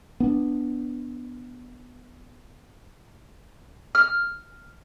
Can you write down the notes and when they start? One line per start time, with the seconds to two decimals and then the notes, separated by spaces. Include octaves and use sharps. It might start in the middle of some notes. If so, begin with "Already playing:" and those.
0.20 B3 D4
3.95 F6